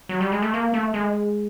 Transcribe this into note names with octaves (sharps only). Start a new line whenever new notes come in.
F#3
G3
G#3
A3
A#3
A3
G#3